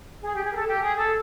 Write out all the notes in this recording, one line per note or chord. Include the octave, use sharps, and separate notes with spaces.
G#4
G4
G#4
A#4
A4
G4
G#4
A4